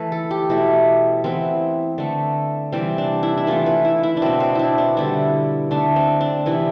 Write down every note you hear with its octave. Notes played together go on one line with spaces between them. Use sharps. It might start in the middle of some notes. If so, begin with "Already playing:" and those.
Already playing: E3 A3 B4
A4
G4
B2 A3 E4
E3 B3 C4
D3 A3
C3 E3 G3 C4
D4
E4
E4
E3 A3 F4
B4
E4
E4
D4
B2 B3 C4
C4
D4 E4
D4
D3 G3 B3 E4
D3 A3 D4
C4
D4
C3 E3 B3 E4